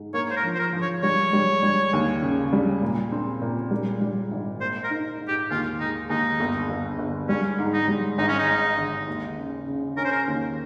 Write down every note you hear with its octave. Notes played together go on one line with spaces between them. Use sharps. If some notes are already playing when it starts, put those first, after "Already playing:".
Already playing: G#2
A#3 C#5
C5
A#4
F3
C5
A#4
F3
C#5
G3 C#5
G3
G3
D#2
C#3
G3
A#2
C4
A#2
G3
G3
G#1
A#3 C5
A#4
D#4
G#2
G4
D#2 F4
G#3 D#4
D#2 D#4
G1
G1
G1
G3 C#4
G#2
D#4
G3
G#1 D#4
C#4
D#4
G#2
G#1
D#2
C#3
C#3
C#4 A#4
C5
A#4
D#2